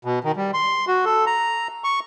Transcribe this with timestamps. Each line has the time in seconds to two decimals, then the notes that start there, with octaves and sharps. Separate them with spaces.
0.05 B2
0.24 D#3
0.36 G3
0.54 C6
0.88 F#4
1.05 A4
1.27 A#5
1.84 C#6